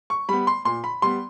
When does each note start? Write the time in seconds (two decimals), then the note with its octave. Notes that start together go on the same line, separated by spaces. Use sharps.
0.10 C#6
0.29 G3 B3 B5
0.47 C6
0.65 A#2 C6
0.84 B5
1.02 G3 B3 C6